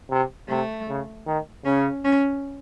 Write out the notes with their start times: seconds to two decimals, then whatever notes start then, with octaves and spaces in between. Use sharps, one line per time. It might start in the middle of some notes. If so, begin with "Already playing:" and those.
0.10 C3
0.49 C3 A3
0.88 C#3
1.27 D#3
1.65 C#3 C#4
2.04 C#4